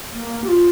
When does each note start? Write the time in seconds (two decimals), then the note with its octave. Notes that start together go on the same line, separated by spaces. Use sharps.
0.12 A#3
0.44 G4
0.48 F4